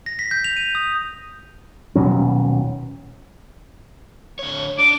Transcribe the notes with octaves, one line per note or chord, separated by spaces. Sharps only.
A#6
B6
G6
F7
D#7
D#6
D#1 B2 F#3 C#4
D3 C#5
D4 D6